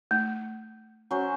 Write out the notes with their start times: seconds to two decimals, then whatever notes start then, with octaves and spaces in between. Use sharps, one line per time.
0.11 A3
1.11 F#3 C#4 C5